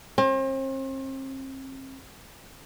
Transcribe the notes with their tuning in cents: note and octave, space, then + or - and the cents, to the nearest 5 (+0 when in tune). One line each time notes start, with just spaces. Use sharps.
C4 +40